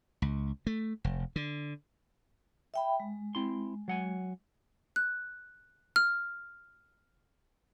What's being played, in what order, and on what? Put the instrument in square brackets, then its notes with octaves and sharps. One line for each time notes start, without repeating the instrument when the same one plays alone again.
[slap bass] C#2
A3
F1
D3
[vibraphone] E5 G5 B5
G#3
[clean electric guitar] C4 E4 C6
F#3 F#5 G#5
[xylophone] F#6
F6